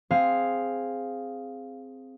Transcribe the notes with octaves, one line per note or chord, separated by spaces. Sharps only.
C4 G#4 F5